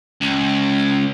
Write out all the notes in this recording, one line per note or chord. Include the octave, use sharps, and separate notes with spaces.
C#2